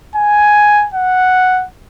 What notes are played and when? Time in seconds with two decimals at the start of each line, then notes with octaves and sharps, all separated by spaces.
0.16 G#5
0.94 F#5